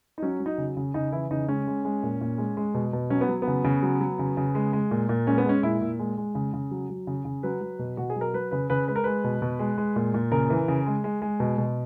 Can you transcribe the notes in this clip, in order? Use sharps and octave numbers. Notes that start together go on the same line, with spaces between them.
D#4
F#3 C#4
F#3
D#4
C#3
C#3
C#3 D#4
E3 E4
C#3 D#4
G#3 C#4
G#3
G#3
A#2
A#2
G#3
G#3
B2
B2
F#3 C#4
B3
F#3
B3
C#3
C#3
F#3
F#3
C#3
C#3
G#3
G#3
A#2
A#2
G#3 C#4
B3
G#3 C#4
A#2 E4
A#2
G#3
G#3
C#3
C#3
F#3
F#3
C#3
C#3
F#3 B4
F#3
B2
B2 F#4
G#4
F#3
A#4
F#3 B4
C#3 B4
C#3 B4
G#3 B4
A#4
G#3 B4
B2
B2
G#3
G#3
A#2
A#2
C#3 A#4
E3
C#3
G#3
G#3
G#3
B2
B2